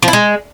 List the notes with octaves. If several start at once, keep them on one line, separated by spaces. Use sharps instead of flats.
F3
E4
G#3